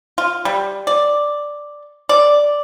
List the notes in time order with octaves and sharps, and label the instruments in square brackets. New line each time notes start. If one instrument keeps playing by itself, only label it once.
[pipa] F4
G3
D5
D5